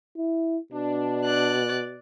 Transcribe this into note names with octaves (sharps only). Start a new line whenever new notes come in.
E4
B2 D4
D5 F#6